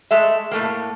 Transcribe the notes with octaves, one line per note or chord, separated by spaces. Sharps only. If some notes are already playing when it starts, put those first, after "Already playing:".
G#3 A3 E5
A2 A3 A#3